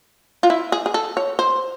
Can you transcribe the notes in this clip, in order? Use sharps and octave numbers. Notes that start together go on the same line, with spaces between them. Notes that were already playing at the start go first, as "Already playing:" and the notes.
F4
E4
G#4
G#4
A4
C#5
C5